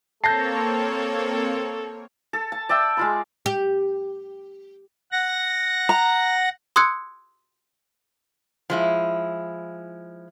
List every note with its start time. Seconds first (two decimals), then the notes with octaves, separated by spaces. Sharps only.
0.24 A#3 C4 A4 C#5 A5 G6 A#6 C7
2.33 A4
2.52 A5
2.69 D5 E5 G5 E6
2.97 G#3 F4 B5
3.46 G4
5.12 F#5 A#6
5.89 A#5
6.76 C6 D#6 E6 F#6 G#6 C#7
8.70 F3 G#3 E4